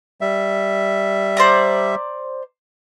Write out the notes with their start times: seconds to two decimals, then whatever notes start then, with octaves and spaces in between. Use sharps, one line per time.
0.21 G3 E5
1.37 C5 D5 A#5